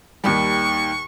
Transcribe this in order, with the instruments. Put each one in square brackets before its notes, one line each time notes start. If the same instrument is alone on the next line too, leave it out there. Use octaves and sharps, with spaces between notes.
[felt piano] D#2 D#3 G3 [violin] C#6